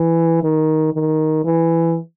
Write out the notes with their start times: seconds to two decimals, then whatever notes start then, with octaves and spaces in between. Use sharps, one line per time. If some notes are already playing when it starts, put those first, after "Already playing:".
Already playing: E3
0.43 D#3
0.94 D#3
1.45 E3